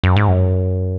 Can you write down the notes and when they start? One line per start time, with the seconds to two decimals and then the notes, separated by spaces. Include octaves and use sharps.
0.03 F#2
0.16 G#2
0.28 F#2